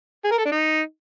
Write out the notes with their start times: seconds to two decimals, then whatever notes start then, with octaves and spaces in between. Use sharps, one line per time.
0.24 G#4
0.31 A#4
0.38 A4
0.45 D4
0.52 D#4